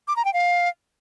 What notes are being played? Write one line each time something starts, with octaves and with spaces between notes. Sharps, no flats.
D6
A#5
G5
F5